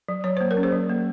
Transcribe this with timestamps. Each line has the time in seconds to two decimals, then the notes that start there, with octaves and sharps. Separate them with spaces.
0.08 F#3
0.24 F#3 C#5
0.37 A#3 C5
0.51 A#4
0.57 C#4
0.63 G#4 C5
0.72 F#3
0.89 A#3